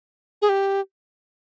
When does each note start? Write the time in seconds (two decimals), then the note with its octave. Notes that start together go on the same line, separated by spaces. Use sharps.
0.42 G#4
0.49 G4